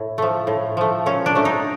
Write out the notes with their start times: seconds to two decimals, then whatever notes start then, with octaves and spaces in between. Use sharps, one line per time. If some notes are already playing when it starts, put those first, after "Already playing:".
Already playing: A2
0.18 F3 A3
0.47 A2
0.77 F3 A3
1.06 A#2 C#4
1.26 D4
1.35 F#3 A3
1.45 D#4